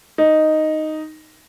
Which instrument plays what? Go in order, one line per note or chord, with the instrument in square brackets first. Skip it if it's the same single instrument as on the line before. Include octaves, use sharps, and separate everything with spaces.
[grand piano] D#4